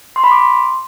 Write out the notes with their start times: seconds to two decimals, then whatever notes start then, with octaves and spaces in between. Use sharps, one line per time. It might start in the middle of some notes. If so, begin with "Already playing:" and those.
0.16 C6
0.24 B5
0.31 D6
0.39 C6